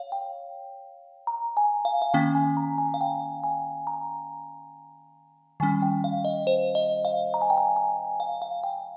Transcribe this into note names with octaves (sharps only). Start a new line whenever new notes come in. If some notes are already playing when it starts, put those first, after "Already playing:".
Already playing: C#5 F5
G5
A#5
G#5
F5
F5
D#3 A#3 C#4 G5
G#5
A#5
G#5
F5
G5
G#5
A#5
D#3 G3 C#4 G#5
G5
F5
D#5
C5
D#5
F5
A#5
G#5
G5
G#5
G#5
F5
F5
G5